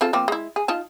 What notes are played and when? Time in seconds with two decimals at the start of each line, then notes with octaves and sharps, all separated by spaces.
0.01 C4 F4 A4
0.13 F3 A#3 C4
0.28 G#3 E4
0.56 G#4
0.68 D#4 F4 A5